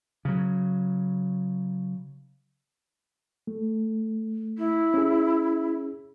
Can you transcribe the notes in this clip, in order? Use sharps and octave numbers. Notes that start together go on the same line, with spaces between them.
C#3 F#3
A3
E4
C#4 G#4